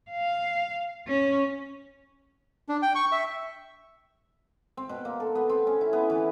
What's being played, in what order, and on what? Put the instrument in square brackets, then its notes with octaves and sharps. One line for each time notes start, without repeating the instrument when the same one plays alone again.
[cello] F5
C#4
[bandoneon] D4
G5
C#6
E5
[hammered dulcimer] C4
B2
A#3
A4
B3
C4
C#4
E4
B3
E3